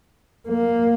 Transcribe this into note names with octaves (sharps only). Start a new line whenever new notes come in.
A#3